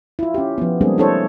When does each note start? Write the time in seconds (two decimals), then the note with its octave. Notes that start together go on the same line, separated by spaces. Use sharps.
0.19 E4 F4
0.34 C#4 G4
0.58 F3 B3
0.81 G3 G#3 A#3 C4 D4 G#4
0.98 D4 E4 A4 C5 C#5